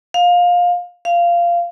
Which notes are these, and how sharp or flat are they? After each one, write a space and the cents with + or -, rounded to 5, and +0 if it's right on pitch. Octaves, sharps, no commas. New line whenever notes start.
F5 +20
F5 -15